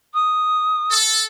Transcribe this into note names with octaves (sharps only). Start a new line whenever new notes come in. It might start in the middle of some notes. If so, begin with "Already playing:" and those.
D#6
A4